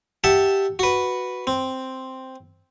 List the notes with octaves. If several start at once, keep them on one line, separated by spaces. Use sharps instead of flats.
G4 E5 F#5 A5
F#4 B4
C4